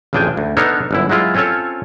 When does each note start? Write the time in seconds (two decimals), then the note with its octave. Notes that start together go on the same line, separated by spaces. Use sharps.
0.13 A1 F2 C#3 D4 G5 G#5
0.37 D2
0.57 B3 D4 D#4 A4 A#4 C#5
0.91 G1 F#2 E4
1.09 F#3 G#3 E4 F4
1.35 C4 C#4 F4 A4 C#5